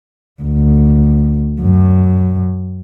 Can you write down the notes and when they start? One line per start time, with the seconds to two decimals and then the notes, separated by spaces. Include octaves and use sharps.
0.42 D2
1.61 F#2